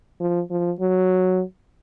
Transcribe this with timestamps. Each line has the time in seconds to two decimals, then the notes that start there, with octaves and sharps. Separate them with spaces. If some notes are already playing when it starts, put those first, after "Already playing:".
0.21 F3
0.51 F3
0.80 F#3